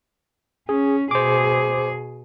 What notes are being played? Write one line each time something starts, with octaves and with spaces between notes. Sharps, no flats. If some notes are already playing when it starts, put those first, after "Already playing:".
C#4 G#4
B2 G#4 C5 D6